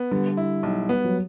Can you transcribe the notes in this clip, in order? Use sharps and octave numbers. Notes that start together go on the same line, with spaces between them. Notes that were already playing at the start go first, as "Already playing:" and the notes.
Already playing: B3
D3 G3
E4
B1
B3
F#3